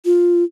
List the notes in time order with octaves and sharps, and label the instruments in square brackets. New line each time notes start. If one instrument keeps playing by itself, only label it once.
[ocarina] F4